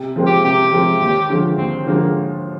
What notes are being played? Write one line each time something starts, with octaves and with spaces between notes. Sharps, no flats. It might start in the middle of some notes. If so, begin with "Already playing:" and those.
Already playing: C3
F3 G#3 C4
G4
C3 G4
F3 G#3 C4
D#2
D3 F3 G#3
D#2 C4
D3 F3 G#3 A#3